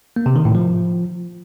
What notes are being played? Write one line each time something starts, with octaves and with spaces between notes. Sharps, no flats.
A#3
C3
D#3
A2
F3